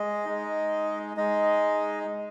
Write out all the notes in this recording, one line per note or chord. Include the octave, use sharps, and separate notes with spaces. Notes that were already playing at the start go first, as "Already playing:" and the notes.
Already playing: G#3 D#5
G#3 D#4
G#3 D#4 D#5